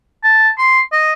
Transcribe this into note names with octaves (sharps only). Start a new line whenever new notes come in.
A5
C6
D#5